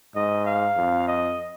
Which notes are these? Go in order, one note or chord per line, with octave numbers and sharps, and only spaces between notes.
G#2 D#5
F5
F2
D#5